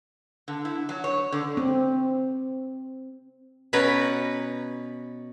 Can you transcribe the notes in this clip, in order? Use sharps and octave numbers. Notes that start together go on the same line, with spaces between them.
D3
E4
F#3
C#5
D3
C4
B2 C#4 B4 A#5